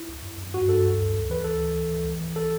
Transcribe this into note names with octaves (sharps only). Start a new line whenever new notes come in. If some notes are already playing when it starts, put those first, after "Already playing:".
Already playing: E4
C#2
F#2
F#2
G2 F#4
G2 A4
D2
D2
C#2
E3 B4
D2 A4
E3
C#2
E3
C#2
E3
A4